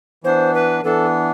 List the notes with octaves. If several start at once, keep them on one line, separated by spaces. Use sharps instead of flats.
E3 B3 D4 C5
B4
E3 B3 D4 A4